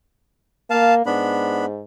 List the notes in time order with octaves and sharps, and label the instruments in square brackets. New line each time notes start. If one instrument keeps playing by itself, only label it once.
[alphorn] A#3 [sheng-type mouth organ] F5 A5
[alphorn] G#2 [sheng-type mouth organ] B3 D4 B5